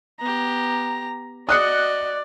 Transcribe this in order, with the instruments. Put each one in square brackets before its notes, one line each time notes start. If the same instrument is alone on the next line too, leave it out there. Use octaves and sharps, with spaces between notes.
[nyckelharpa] B3 G4 [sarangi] A#5
[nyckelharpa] F#4 D#5 [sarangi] D5 [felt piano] D#6 F#6 C#7